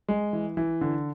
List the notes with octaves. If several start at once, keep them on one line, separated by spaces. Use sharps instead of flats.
G#3
E3
E3
D3